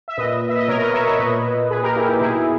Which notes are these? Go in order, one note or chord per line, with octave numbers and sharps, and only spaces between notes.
E5
A#2 B4 D#5
E5
D#5
B2 A#4 C#5
B4 D#5
C#5 E5
C#5 E5
A#2 B4 D#5
A#2 G#4 B4
G4 A#4
E4
D#4 G4
B2 E4 G#4